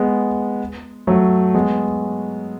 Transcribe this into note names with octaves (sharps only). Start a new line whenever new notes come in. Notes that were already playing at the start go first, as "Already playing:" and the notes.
Already playing: G#3 B3
F#3 A3
G#3 B3